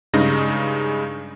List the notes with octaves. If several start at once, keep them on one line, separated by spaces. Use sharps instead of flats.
G2 C#3 G#3 D#4 A#6